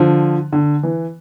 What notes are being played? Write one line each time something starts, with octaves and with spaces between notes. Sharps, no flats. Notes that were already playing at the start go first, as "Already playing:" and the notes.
Already playing: D3 F3
D3
E3